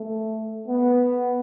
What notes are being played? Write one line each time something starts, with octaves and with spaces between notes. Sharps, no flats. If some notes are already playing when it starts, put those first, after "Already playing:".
Already playing: A3
B3